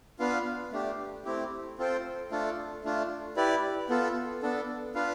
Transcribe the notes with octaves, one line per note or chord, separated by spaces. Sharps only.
B3 D4 F4 B4 F5
A3 D4 G4
A3 C4 E4 G4
C4 F4 A4 C5 G5
A3 D4 F4 A4
A3 D4 F4
E4 G4 B4 D5
B3 F4 A4
B3 D4 A4
D4 F4 B4 F5